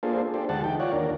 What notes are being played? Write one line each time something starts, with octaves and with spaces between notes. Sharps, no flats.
A#3 D4 F4 G#4 A4 C5
D4 G4 A4 C5
D2 G#3 G4 F#5 A5
E3 D#4 G5
F4 C#5 D5 F#5
D#2 D4 A#4